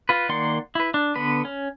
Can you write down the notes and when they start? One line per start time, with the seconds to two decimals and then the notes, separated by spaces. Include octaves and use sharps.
0.09 F4 B4
0.29 D#3 A#3 D5 F#5 C6
0.75 E4 B4
0.94 D4
1.15 D3 B3 B4
1.45 C#4